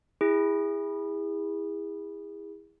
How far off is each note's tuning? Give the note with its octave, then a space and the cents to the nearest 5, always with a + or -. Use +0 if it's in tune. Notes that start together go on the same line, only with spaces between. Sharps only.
E4 -10 G#4 -30